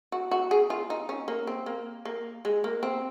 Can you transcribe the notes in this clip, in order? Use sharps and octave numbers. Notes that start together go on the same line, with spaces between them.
F#4
F#4
G#4
F4
D#4
C#4
A#3
C4
A#3
A#3
G#3
A#3
C4